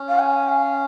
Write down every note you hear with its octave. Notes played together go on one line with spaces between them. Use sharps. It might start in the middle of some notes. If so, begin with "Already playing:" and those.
Already playing: C#4
F5
G#5
F5